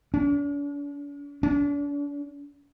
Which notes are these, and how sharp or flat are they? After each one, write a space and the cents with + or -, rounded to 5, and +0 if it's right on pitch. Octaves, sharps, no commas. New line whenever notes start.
D4 -45
D4 -40